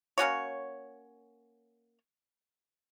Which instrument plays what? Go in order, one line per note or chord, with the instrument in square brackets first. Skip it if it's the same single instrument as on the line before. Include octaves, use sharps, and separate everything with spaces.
[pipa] A#3 C#4 F#4 C#5